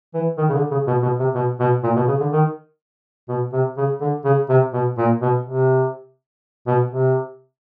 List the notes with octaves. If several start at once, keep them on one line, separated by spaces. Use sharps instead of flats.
E3
D#3
C#3
D3
C#3
B2
B2
C3
B2
B2
A#2
B2
C#3
D3
D#3
B2
C3
C#3
D3
C#3
C3
B2
A#2
B2
C3
B2
C3